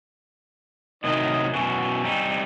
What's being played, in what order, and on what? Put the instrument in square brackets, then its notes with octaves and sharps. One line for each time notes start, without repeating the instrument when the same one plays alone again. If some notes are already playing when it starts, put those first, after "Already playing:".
[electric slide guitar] A2 C3 F#3 [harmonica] D#3 D#5
[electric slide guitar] F#2 B2 E3 [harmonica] G#5 C#6
[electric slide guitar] G3 C4 D#4